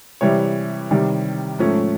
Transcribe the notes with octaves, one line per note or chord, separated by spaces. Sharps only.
C3 E3 G3 C#5
C3 D#3 G3
G#2 F3 A3 C#4